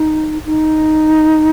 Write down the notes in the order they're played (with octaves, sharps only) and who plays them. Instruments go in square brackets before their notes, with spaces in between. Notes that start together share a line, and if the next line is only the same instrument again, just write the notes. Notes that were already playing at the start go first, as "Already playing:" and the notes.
Already playing: [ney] D#4
D#4